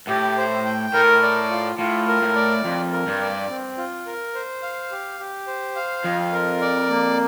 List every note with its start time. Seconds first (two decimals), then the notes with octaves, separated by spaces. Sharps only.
0.08 A2 G4
0.37 C5
0.65 G5
0.94 A2 A#4
1.23 D5
1.51 F4
1.78 A2 F4
2.08 A#4
2.22 A2
2.35 D5
2.64 F2 F4
2.92 A#4
3.07 G2
3.21 D5
3.49 C4
3.78 F4
4.06 A#4
4.34 C5
4.63 F5
4.91 G4
5.19 G4
5.47 C5
5.76 F5
6.04 F2 F4
6.32 A#4
6.61 D5
6.89 A#3